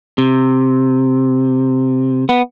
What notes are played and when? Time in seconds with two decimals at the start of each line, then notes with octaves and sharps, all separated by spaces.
0.18 C3
2.29 B3